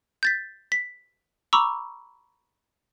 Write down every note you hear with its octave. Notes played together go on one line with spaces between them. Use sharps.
G6 A6 B6
B6
A#5 B5 C#6 D6 E6